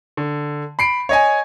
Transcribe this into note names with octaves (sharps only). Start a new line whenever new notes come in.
D3
B5 C7 D7
C#5 D#5 G#5